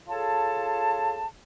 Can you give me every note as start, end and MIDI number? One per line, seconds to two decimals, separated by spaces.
0.07 1.24 65
0.07 1.24 68
0.07 1.24 69
0.07 1.24 73
0.07 1.24 81